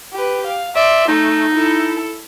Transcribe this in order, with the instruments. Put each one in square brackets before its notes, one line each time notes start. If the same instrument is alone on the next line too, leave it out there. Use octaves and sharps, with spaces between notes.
[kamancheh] G4 B4
F5
[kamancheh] D5 C6 [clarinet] E5
[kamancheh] A3 [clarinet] D#4
[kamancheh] E4 A4